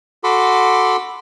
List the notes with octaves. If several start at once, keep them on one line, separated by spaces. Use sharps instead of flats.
F#4 A4 B5 C6 D6